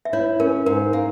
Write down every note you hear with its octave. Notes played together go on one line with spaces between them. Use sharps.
E5
E4 C#5
C#4 A#4
G#2 A#4
A#3